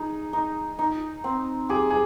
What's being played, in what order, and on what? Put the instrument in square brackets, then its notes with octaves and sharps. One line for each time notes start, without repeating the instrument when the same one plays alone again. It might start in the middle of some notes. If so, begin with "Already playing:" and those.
Already playing: [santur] D#4 [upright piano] G#4
[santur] D#4
D#4
C4
[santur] G4 [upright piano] G#4
[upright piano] G#4